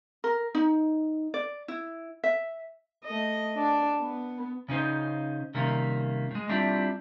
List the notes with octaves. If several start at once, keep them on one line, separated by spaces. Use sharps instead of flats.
A#4
D#4
D5
E4
E5
A3 D#5
D4 D5
B3
C#3 C#4 D#4 C5
C3 D#3 G3 A#3 C#4
A2 G#3
G3 C4 D4 E4 F4 G4